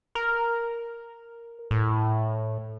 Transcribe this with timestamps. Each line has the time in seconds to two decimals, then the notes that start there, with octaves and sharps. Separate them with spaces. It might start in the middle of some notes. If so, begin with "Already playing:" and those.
0.15 A#4
1.71 A2